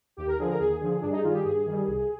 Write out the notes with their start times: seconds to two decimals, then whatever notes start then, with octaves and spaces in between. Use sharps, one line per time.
0.17 D#2 G4
0.27 A#4
0.39 D3 F3 G#4
0.49 A#4
0.59 D#2 G#4
0.81 D3 F3
1.01 G2 D4
1.12 D#4
1.23 D#3 G3 F4
1.33 G4
1.45 G2 G#4
1.66 D#3 G3
1.87 C2